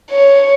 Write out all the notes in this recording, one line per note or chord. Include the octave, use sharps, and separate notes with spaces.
C#5